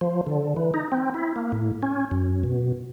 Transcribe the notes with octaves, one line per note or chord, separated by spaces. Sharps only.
F3
D3
E3
D#4
C4
E4
A#3
A2
C#4
F#2
B2